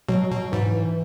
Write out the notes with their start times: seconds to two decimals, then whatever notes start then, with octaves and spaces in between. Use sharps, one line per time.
0.09 B2 F#3
0.30 B2
0.52 G#2 E3